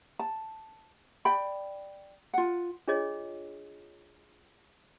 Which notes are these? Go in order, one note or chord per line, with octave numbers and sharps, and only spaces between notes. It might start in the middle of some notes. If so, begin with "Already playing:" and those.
A5
D5 G5 B5
F4 F#5
D4 F4 G#4 C#5 D#5